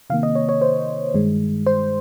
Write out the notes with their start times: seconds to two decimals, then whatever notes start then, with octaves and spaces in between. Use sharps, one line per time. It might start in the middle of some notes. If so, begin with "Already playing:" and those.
0.10 C3 D#3 A#3 F5
0.23 D#5
0.35 C#5
0.49 C#5
0.61 C5
1.14 G2 D#3 G#3
1.66 C5